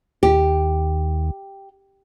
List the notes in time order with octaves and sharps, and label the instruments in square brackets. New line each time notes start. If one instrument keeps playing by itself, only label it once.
[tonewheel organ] D#2 [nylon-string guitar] G4